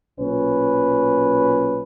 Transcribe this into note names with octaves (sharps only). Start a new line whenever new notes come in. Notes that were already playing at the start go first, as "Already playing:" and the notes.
B1 A#2 C#4 B4